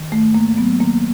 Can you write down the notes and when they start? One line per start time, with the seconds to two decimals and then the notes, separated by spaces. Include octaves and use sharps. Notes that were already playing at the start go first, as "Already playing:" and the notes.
Already playing: D#3
0.12 G#2 A3
0.34 G#2 A#3
0.57 F#3 B3
0.79 D#3 A#3